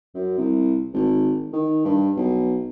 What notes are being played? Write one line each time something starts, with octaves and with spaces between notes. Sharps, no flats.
F#2
C2
G#1
D#3
G2
B1